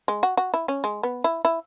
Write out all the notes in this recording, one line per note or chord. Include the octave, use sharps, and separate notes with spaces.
G#3
F#4
F#4
E4
C#4
G#3
B3
E4
E4